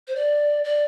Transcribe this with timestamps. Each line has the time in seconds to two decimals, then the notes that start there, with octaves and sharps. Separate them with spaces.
0.08 C5
0.16 D5
0.64 D5